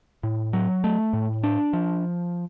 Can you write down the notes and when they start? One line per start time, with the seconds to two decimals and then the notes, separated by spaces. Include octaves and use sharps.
0.23 A2
0.53 F#3
0.84 A3
1.13 A2
1.43 D4
1.73 F3